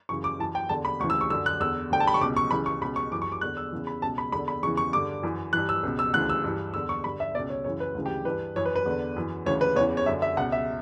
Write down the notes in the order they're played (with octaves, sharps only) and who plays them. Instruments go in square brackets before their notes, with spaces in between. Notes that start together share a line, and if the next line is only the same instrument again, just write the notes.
[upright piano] F#2 C#3 E3 C#6
D6
F#2 E3 A5
G5
E2 D3 A5
B5
D2 C#3 E3 C#6
E6
C#6
F#2 D3 E6
F#6
E2 D3 E6
D2 D3 G5
A5
B5
C#6
C#2 D6
B2
C#6
C#2 C#3 E3 B5
C#6
C#2 B2 B5
C#6
F#2 E3 D6
C#6
D6
E2 D3 F#6
E6
E2 C#3 E3
B5
C#2 B2 A5
B5
E2 B5
D3
B5
E2 C#3 E3 C#6
C#6
G2 D3 D6
F#2 E3
G2 E3 F#6
E6
C#2 B2
E6
D2 C#3 E3 F#6
E6
G2 E3
E2 D3 E6
C#6
G2 D3 B5
E5
B2 D5
C#2
C#5
F#2 C#3 E3 C#5
B4
D2 C#3 E3
G4
G2 E3 B4
F#2 E3 C#5
B4
B4
E2 D3
F#2 E3
D2 C#3 E3 C#5
B4
E2 C#3 E3 C#5
C#5
F#2 D3 E5
E5
C#2 B2 F#5
E5